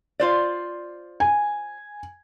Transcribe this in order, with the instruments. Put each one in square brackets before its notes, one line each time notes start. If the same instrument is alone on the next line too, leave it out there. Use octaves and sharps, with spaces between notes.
[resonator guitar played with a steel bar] F4 C5 D5
[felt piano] G#5